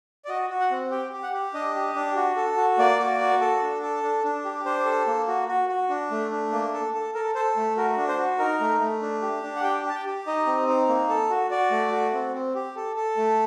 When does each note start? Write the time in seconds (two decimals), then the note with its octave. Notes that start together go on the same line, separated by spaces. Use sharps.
0.25 D5
0.28 F#4 D#5
0.50 F#4
0.60 F#5
0.71 C4
0.91 G4 G5
1.12 G4
1.23 F#5
1.33 G4
1.54 D4 D#5
1.75 G4
1.95 D4
2.16 F#4
2.36 A4
2.57 F#4
2.79 A#3 D5
2.99 F#4
3.20 F#4
3.41 A4
3.62 D4
3.82 A4
4.03 D4
4.24 D4
4.45 G4
4.65 D4 C5
4.85 A4
5.07 A#3
5.28 F#4
5.48 F#4
5.69 F#4
5.89 D4
6.11 A3
6.31 D4
6.52 A#3
6.74 A4
6.94 A4
7.14 A4 A#4
7.35 A4 C5
7.56 A3
7.77 F#4 A#4
7.97 D4
8.08 C5
8.18 F#4
8.39 D#4 A#4
8.61 A3
8.81 A3
9.02 D4
9.22 G4
9.43 D4
9.56 F#5
9.63 G4 G5
9.85 G4 A5
9.95 G5
10.06 G4
10.27 D#4 D#5
10.46 C4
10.68 D#4
10.89 A#3
11.09 A4
11.30 F#4
11.51 F#4 D5
11.71 A3
11.92 F#4
12.13 C4
12.33 C4
12.55 G4
12.76 A4
12.96 A4
13.17 A3